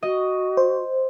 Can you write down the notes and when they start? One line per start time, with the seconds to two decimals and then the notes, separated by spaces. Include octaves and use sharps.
0.03 F#4 D#5
0.57 C5